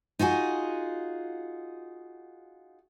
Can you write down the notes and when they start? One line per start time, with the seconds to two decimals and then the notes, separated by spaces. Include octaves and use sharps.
0.19 D#4 F4 F#4 G#4